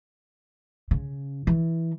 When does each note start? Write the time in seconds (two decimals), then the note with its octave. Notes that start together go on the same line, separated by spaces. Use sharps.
0.91 C#3
1.47 E3